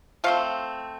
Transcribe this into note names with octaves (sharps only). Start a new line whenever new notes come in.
F3 A3 C4 F5